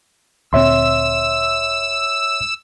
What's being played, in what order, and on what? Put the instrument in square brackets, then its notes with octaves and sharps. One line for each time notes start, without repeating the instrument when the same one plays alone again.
[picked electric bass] D2 A#2 C4 [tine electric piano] C#5 E5 C6 [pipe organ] E6